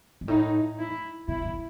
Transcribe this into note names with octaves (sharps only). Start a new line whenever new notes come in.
G#2
A2 D#4
E4
B2 E4
A2